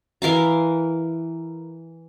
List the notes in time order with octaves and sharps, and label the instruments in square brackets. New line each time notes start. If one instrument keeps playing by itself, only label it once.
[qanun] E3 A#4 F5 A#5